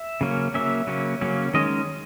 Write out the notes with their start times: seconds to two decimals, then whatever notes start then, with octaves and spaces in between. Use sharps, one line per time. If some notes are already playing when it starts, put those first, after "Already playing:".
Already playing: E5
0.21 C#3 F#3 A#3 C#4
0.54 C#3 F#3 A#3 C#4 E5
0.87 C#3 F#3 A#3 C#4
1.21 C#3 F#3 A#3 C#4
1.54 D#3 G#3 C#4 D#5